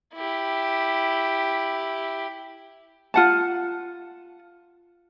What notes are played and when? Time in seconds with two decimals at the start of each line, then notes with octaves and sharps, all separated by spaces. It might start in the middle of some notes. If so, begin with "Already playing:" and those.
0.14 E4 G4
3.14 F4 F#5 A5